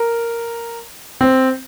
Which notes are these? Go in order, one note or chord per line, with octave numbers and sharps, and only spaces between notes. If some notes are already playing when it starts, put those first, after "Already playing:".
Already playing: A#4
C4